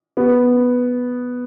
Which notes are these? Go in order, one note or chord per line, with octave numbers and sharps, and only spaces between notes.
B3